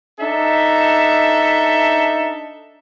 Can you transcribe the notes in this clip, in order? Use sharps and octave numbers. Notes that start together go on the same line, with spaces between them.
D4 D#4 A4 E5